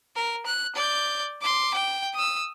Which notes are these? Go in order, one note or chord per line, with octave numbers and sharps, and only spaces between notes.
A#4
F#6
D5 G6
C6 D6
G5
D#6 E6